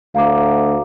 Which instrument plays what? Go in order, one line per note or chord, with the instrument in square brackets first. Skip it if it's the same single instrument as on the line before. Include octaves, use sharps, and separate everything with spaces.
[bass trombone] D2 [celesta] F5 A#5 D6